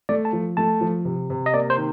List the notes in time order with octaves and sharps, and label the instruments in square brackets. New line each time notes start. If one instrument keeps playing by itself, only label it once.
[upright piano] A3 [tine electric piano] D5
[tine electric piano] A5
[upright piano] F3
[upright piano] A3 [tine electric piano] A5
[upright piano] F3
C3
C3
[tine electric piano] D#5
[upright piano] A#3 [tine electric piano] D5
[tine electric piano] C5
[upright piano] D#3